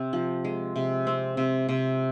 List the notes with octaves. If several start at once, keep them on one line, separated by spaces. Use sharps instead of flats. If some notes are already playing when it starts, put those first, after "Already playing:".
Already playing: C3 C4
F3
G#3
C3
C4
C3
C3